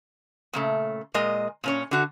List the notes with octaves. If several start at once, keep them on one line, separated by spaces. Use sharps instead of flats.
A#2 C#3 A3
A#2 G#3 A#4 D#5
A#2 C#4 C#5
D3 F#4